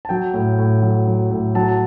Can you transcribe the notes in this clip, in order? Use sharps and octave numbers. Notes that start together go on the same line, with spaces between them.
A5
F#3 G5
A2
A2
F#3
F#3
A2
F#3 A5